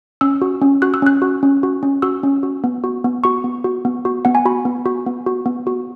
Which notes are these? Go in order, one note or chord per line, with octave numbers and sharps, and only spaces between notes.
C#4 E6
F#4
C#4
F#4 F#6
E6
C#4 F#6
F#4
C#4
F#4
C#4
F#4 E6
C#4
F#4
B3
F#4
B3
F#4 C#6
B3
F#4
B3
F#4
B3 F#5
G#5
F#4 B5
B3
F#4
B3
F#4
B3
F#4